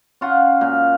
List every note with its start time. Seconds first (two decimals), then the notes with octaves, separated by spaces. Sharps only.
0.21 C#4 F4 F#5
0.61 A#2